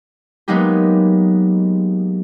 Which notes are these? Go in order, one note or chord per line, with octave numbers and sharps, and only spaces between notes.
F#3 G#3 A#3 B3 D#4 G4